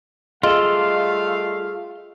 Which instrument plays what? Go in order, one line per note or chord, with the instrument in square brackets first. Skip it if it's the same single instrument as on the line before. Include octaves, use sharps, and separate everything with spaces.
[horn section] G3 A3 F5 [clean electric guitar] F4 [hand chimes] G#4 [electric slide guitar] A4 D#5